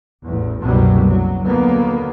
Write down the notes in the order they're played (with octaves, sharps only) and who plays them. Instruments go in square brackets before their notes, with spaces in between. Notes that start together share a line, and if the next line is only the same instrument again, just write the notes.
[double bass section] A1 E2
F#1 C2 F#2 B2 F#3 G3
F#3
D#2 D3 F#3 A#3 B3